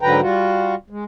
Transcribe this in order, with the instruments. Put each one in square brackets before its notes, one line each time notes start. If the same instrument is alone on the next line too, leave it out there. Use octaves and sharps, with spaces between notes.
[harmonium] G#2 D3 F#3 B4 G5 A#5
G3 F4 F#4
G#3